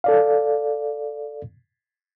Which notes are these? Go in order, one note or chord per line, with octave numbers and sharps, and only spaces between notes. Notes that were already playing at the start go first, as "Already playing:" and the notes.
A4 D5 F5